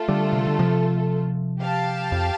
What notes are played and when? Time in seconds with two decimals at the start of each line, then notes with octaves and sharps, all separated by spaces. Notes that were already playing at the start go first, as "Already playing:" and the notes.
Already playing: A3 F4 A4
0.08 D3 G3
0.33 C3
0.47 D3
0.59 C3 F3
1.61 G4 F5 A5
2.12 F2